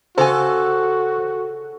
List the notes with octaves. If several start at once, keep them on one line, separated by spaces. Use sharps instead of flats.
C#3 F#4 A4 C5 G#5